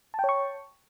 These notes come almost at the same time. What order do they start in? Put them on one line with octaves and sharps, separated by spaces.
A5 G5 C#5 C#6